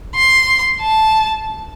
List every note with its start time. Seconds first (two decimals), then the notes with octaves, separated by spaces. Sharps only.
0.15 C6
0.81 A5